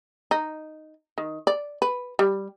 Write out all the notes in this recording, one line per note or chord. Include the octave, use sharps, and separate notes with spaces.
D#4
D#3
D5
B4
G3